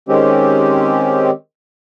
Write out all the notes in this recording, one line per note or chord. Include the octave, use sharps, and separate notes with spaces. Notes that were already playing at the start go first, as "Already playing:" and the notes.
D#3 G#3 C4 C#4 G4